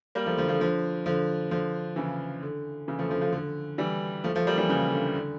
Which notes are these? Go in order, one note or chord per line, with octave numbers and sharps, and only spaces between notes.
G3 A#3
F3 A3
D3 F3
D3 F3
D3 F3
D3 F3
D3 F3
C#3 E3
D3
C#3 E3
F3 A3
D3 F3
D3 F3
D3
E3 G3
F3 A3
F3 A3
G3 A#3
E3 G3
C#3 E3
D3
D3